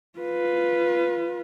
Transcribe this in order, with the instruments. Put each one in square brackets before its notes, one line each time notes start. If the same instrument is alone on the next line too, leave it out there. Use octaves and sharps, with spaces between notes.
[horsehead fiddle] F4 B4